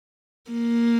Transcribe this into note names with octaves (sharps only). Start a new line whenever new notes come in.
A#3